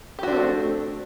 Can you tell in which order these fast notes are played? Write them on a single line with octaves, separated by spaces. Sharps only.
G4 F#4 D4 C4 A3